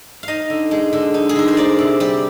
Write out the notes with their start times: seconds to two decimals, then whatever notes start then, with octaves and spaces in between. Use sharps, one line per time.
0.23 D#4 D#5 F5
0.50 D3
0.71 G#3
0.93 D3
1.14 D#4
1.29 G#4
1.36 D3 A#4
1.48 C5
1.57 A#3 D5
1.79 C3
2.00 G3 G4